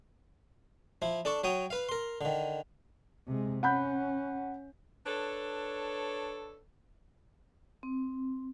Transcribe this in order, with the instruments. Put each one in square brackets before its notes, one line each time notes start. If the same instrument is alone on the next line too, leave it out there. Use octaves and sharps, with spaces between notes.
[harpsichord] F3 E4
D4 A4 A5 C#6
F#3 C#5 G5 D#6
B4 F5
A#4 C6
D3 D#3
[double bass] C3 G#3
[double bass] C#4 [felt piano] F#5 B5 G6
[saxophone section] D4 A4 B4 C#5
[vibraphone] C4